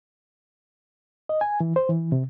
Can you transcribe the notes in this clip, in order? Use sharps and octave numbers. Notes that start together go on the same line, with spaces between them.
D#5
G#5
E3
C5
E3
C3